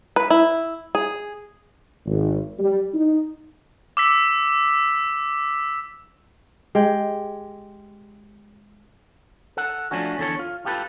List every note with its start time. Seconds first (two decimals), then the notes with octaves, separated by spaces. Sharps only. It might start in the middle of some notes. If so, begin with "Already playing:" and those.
0.16 B4
0.30 E4
0.95 G#4
2.05 G#1
2.58 G3
2.93 D#4
3.97 D6 E6 B6
6.75 G#3 G4 G5
9.57 A4 F#5
9.91 F3 A3 C#4 D4 F#4
10.18 E2 D3 A4 C#5
10.39 F4
10.65 F4 G4 A4 B4